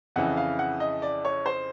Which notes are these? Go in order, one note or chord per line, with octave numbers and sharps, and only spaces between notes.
F2 C#3 E3 F#5
F5
F#5
D#5
D5
C#5
C5